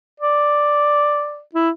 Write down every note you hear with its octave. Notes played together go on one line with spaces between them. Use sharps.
D5
E4